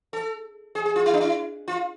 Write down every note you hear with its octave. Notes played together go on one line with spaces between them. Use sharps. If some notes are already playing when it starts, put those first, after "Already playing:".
A4
G#4
G#4
F4
E4
D4
E4
F4